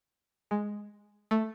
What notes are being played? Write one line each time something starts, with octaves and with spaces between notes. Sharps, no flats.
G#3
A3